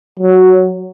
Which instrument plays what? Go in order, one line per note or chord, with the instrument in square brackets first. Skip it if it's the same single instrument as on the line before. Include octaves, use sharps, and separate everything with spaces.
[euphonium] F#3